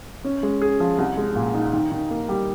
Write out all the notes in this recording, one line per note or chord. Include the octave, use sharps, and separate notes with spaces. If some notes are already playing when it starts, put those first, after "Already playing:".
C#4
G#3
G#4
F3
C2
G#3
A#2
D#4
D#3
D#3
A#3
G3